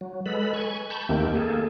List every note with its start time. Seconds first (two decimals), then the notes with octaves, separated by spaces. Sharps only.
0.01 F#3
0.26 G#3 A4 B4 B5
0.53 G#5 C#6
0.90 A5 B5 C#6 G6
1.09 D#2 D#3 A3 A#3 C4 G4
1.35 A#3 G#4 A4